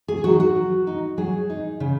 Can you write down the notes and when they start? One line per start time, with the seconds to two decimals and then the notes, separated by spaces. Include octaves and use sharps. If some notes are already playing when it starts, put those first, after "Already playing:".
0.08 G#4
0.24 F#3 D#4 F#4
0.40 F#4
0.56 F#3
0.87 D#4
1.18 F#3 G#4
1.50 D#4
1.80 C#3